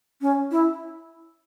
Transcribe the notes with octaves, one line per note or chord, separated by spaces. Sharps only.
C#4
E4